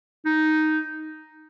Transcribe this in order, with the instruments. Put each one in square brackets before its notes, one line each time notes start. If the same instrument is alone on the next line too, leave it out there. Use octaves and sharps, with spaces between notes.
[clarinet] D#4